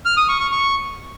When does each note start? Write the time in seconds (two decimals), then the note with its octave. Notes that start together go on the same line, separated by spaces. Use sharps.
0.05 F6
0.17 D#6
0.29 C#6
0.40 C#6
0.52 C#6